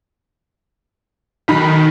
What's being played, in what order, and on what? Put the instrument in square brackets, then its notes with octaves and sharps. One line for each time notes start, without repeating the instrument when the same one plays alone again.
[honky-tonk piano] B1 D#4 B5 [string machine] D#3